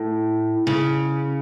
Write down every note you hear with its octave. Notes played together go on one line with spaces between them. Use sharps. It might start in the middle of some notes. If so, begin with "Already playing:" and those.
Already playing: A2
C#3